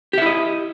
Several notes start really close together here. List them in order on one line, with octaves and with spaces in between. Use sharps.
G4 E5 E4 D#5